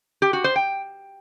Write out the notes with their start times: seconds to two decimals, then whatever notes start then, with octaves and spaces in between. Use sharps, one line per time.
0.22 G4
0.33 F#4
0.44 C5
0.56 G5